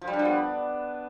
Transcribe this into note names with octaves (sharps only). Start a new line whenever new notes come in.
F3
G3
D4
F3
B3